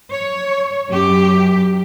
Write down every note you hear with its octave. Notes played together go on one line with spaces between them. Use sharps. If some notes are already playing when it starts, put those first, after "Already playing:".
C#5
F#2 G4